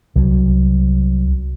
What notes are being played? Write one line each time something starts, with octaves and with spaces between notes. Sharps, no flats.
C2 F#3